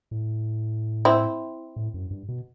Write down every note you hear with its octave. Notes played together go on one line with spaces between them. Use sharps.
A2
C4 E4
A2
F#2
G2
B2